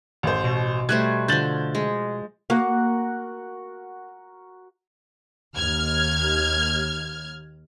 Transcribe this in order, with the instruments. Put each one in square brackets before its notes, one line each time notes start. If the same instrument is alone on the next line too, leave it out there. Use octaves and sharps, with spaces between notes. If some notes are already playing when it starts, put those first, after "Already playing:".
[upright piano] A1 C5
[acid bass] B2
[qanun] G3 A3 C5 [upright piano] F#6 G#6
[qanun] D3 F3 [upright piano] G6 A6 F#7
[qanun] G#3
[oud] A#3 [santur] F#4 A#4 F#5
[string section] D#2 F6 G#6